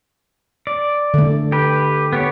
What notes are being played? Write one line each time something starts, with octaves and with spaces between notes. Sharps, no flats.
D5
D3 A3
G4 B4
B3 G4 C#5